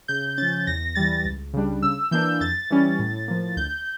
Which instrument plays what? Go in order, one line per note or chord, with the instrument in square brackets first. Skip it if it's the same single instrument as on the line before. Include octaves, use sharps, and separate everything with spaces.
[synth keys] C#3 G6
F3 C#4 A6
E2 A#6
E3 G3 A6
C#2
C#3 G3 D4
C#3 E6
E3 A#3 D4 G6
F2 A6
E3 G3 C#4
A2
F3 A#3
D2 G6